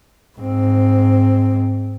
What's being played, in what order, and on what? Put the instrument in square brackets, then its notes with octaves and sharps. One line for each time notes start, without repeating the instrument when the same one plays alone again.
[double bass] G#2 C4